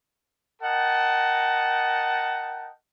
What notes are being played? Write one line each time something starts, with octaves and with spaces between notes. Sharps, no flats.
A#4 D#5 F#5 G5 A5